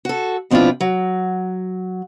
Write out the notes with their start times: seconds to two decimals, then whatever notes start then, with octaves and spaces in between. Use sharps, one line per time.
0.05 F#4 A4
0.51 B2 F3 C4 D4 E4 F4
0.80 F#3